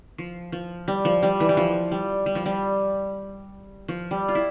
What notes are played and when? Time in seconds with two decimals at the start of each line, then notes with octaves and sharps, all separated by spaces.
0.18 F3
0.52 F3
0.88 G3
1.05 F3
1.23 G3
1.40 E3
1.49 G3
1.57 F3
1.92 G3
2.26 G3
2.35 F3
2.46 G3
3.88 F3
4.11 G3
4.28 F4
4.35 E4